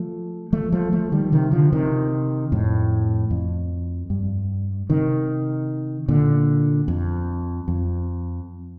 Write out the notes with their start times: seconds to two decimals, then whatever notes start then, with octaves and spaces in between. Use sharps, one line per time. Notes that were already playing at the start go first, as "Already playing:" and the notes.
Already playing: F3 A3
0.53 F3 A3
0.72 F3 A3
0.92 F3 A3
1.12 D#3 G3
1.32 C3 D#3
1.52 D3 F3
1.73 C3 D#3
2.52 F2 A2
3.31 F2
4.10 G2
4.90 C3 D#3
6.08 A#2 D3
6.88 F2
7.68 F2